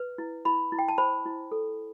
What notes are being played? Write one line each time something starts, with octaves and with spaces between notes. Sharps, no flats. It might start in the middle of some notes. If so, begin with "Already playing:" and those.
Already playing: B4
E4
E4 B5
E4
G5
A5
C5 B5
E4
A4